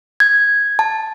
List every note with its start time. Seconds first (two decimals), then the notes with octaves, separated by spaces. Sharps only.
0.20 G#6
0.79 A5